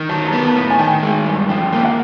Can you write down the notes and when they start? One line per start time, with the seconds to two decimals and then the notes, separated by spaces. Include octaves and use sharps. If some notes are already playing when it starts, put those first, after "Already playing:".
Already playing: D#3
0.09 F#3 A5
0.27 A#5
0.33 B3
0.44 A5
0.56 A2
0.61 A5
0.70 G#5
0.78 D#3 G5
0.87 G#5
1.03 G#3
1.25 G2
1.49 F3 G5
1.72 A#3
1.85 F#5